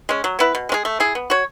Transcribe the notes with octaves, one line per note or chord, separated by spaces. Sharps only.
G#3 C#4
F#3
B3 E4 B4
B2
G#3 C#4 G#4
A3
E4 G#4
B3
F#4 C#5